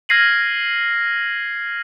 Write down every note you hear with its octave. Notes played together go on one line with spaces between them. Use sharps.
F6 G#6 A#6 C7 D#7 F#7